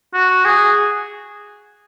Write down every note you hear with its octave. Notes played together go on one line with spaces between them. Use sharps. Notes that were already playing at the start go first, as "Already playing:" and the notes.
F#4
G#4